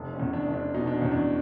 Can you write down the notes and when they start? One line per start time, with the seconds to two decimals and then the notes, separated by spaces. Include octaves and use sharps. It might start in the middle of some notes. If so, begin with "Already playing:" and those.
Already playing: F1
0.13 C#4
0.20 E2
0.33 D4
0.47 F1
0.54 D4
0.74 B2 D#4
0.87 D4
0.99 E2 C#4
1.11 D4